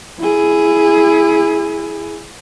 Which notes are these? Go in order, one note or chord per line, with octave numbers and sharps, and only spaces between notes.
E4 G#4